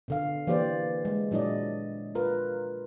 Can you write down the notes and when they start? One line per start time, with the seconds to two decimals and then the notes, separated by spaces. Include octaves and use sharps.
0.08 B2 D3 F5
0.47 E3 A#3 G4 C5 D5
1.05 G#3
1.31 A#2 F#3 D4 E4 D5 D#5
2.15 F4 A#4 B4